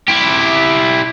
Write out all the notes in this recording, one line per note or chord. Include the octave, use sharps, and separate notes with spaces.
E4 G4